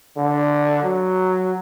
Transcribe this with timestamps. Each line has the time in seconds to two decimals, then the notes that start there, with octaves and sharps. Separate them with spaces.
0.17 D3
0.83 F#3